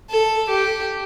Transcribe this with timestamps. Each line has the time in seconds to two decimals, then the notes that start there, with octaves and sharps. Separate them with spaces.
0.10 A4
0.49 G4